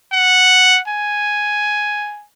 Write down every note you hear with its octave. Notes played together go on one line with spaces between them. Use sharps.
F#5
G#5